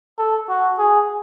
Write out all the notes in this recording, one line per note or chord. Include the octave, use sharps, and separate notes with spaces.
A4
F#4
G#4